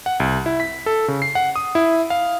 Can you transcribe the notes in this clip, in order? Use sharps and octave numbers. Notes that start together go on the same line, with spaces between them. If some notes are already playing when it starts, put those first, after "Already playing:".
F#5
C2
E4
B6
A4
C#3
C7
F#5
D#6
E4
F5